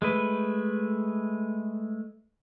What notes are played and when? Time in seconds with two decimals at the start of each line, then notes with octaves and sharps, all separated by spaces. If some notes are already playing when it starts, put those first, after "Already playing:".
0.02 G#3 A3 B4